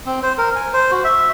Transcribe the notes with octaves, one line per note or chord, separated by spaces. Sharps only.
C4
C5
A#4
G#5
C5
F#4
E5